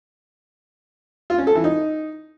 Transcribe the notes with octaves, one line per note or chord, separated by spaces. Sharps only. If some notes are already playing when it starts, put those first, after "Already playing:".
F4
C#4
A4
E3
D#4